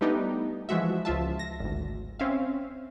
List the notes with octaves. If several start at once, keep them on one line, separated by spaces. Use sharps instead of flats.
G3 A3 B3 D4 D#4 G4
E3 F3 G#3 F#4 E5
C#2 F3 F4 E5 A5
A#6
G#1 D2
C4 C#4 E5 F5